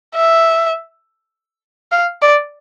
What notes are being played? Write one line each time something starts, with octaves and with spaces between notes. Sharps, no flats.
E5
F5
D5